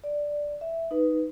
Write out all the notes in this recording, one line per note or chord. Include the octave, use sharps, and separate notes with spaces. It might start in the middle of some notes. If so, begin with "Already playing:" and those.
D5
E5
D#4 B4